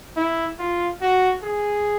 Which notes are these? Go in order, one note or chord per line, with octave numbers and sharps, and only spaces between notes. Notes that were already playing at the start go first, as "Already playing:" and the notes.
E4
F4
F#4
G#4